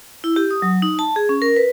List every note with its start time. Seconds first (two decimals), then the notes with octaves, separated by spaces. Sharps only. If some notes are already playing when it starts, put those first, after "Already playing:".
0.24 E4
0.36 G4
0.51 D#6
0.62 F#3
0.82 D#4
0.99 A5
1.16 G#4
1.29 C#4
1.42 A#4
1.56 B4